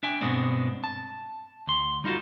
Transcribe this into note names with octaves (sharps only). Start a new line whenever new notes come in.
D4 E5 G5 G#5
G2 B2 G#3 B3 C4 D4
A5
D2 C6
G3 D#4 F4 F#4 A4